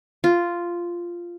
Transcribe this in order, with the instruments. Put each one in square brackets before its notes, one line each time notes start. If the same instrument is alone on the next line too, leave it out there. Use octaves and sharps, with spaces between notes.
[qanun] F4